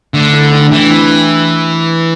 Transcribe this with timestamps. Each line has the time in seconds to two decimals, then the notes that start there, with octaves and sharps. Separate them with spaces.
0.13 D3 A3
0.33 E4 A4
0.52 D4 G4
0.71 E3 D4 G4
0.90 C4 E4